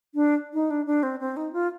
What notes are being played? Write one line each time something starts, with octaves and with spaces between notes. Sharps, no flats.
D4
D#4
D4
D4
C4
C4
D#4
F4